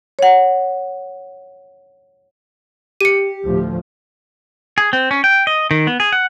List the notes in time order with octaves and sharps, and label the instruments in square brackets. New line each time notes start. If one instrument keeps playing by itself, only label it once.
[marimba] C#5 F#5
[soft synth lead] G4 [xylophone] C#7 D#7
[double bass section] D2 A2 F3
[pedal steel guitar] G#4
C4
C#4
G5
D#5
D#3
B3
G#4
F#5